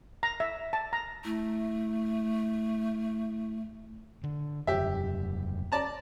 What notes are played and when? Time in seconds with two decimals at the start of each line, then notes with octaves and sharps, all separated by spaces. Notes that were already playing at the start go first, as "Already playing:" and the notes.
0.23 A#5
0.40 E5
0.73 A5
0.93 A#5
1.25 A3 E4
4.24 D3
4.67 E1 F#2 G4 E5
5.72 D5 A5 A#5